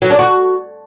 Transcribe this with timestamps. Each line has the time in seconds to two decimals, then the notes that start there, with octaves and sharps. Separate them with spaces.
0.02 F#3
0.10 D4
0.19 F#4